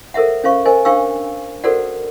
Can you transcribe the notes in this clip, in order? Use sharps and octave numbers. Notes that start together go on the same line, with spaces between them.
A4 A#4 C5 E5 F#5
C#4 C5 F5 C#6
A#4 C5 D#5 G#5
D4 C5 F5 G5 C#6 E6
F#4 A4 A#4 C5 D5 F#5